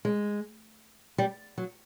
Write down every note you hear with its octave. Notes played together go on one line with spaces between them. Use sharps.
G#3
G3
F#3